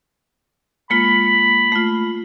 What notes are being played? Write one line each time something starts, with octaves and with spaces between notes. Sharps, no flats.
G#3 A#3 F4 B5
A3 F4